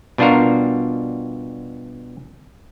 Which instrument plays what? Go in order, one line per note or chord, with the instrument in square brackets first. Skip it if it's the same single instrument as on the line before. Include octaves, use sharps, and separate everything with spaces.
[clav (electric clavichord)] B2 G3 D4 F4 F#4 A#4